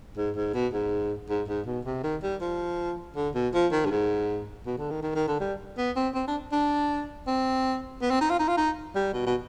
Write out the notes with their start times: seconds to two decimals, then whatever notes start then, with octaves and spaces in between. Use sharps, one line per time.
0.17 G#2
0.36 G#2
0.54 B2
0.73 G#2
1.29 G#2
1.48 G#2
1.66 B2
1.85 C3
2.03 D#3
2.23 G3
2.41 F3
3.16 D3
3.35 B2
3.54 F3
3.72 D#3
3.85 G2
3.91 G#2
4.66 B2
4.78 D3
4.90 D#3
5.02 D#3
5.15 D#3
5.28 D3
5.40 G3
5.78 B3
5.96 C4
6.14 C4
6.27 D4
6.52 D4
7.27 C4
8.02 B3
8.10 C4
8.21 D#4
8.30 F4
8.39 D#4
8.48 F4
8.57 D#4
8.95 G3
9.13 B2
9.26 B2